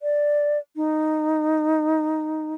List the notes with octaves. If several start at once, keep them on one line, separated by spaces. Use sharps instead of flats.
D5
D#4